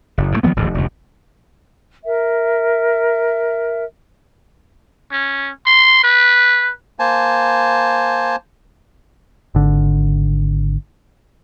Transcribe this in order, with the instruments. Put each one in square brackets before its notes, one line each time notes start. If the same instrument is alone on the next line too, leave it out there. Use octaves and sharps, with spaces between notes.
[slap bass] F#1
A2 D3 A3
D#3 F3 A3 B3
D1 A1 E2 G#2
F1 D2 G#2
[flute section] A#4 E5
[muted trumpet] C#4
C6
B4
[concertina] A#3 C5 G#5 A5
[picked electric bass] G#1 D3